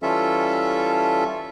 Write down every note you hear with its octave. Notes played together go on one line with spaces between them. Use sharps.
E3 G3 C#4 F4 A4 E5